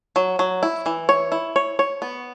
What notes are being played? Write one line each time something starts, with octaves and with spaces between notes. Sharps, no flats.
F#3
F#3
E4
E3
C#5
E4
C#5
C#5
B3